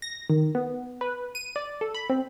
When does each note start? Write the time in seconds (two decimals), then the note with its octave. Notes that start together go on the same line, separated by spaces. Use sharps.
0.02 A#6
0.30 D#3
0.55 B3
1.01 B4
1.35 D#7
1.56 D5
1.81 A4
1.94 B5
2.10 C4